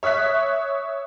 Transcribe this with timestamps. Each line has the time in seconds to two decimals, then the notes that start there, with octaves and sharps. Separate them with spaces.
0.03 C#5 E5 D#6 F#6 B6